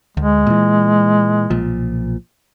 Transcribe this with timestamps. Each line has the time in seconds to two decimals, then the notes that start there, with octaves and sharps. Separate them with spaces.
0.17 D2 G#3
0.46 A#2 E3
1.50 B1 A#2 F3